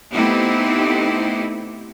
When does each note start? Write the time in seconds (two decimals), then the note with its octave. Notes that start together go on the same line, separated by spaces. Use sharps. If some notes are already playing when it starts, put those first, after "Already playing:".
0.13 A3 B3 C4 D#4 E4 G4